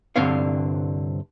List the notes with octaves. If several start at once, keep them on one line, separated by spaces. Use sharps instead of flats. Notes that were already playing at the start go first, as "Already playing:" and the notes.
C2 G2 D3 C4 C#5 F5